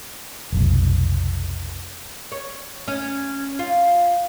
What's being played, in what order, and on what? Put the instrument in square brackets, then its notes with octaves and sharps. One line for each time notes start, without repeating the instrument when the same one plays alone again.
[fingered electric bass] F1 B1
[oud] C#5
C#4
F4